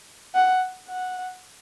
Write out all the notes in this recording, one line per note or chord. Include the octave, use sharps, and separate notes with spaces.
F#5
F#5